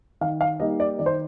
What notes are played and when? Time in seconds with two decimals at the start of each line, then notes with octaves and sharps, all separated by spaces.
0.21 D#3 F5
0.41 F5
0.60 G3 A#3 D#4 D#5
0.80 D5
0.99 D#3 D5
1.06 C5